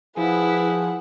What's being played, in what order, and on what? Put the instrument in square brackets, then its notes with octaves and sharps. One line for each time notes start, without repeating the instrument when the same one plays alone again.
[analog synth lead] F3 [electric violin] E4 [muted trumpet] G#4 [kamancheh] B4 F#5